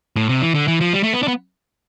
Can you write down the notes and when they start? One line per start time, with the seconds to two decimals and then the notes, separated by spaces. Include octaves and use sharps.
0.16 A2
0.29 C3
0.42 E3
0.55 D3
0.68 E3
0.81 F3
0.94 G3
1.03 A3
1.13 B3
1.23 D4
1.28 B3